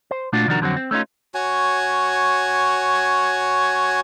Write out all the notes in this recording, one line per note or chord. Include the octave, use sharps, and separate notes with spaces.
C5
A#2 A3 D4 F4 F#4
C2 D#3 F3 D4 F#4 A#4
F2 D3 F#3 C4 F#4
C4
A3 C#4 D#4 F4
F#4 C#5 G#5